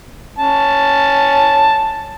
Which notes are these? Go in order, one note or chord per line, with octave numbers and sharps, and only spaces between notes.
C#4 A5